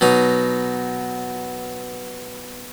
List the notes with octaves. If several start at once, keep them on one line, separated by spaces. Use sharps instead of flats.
B2 F#3 D#4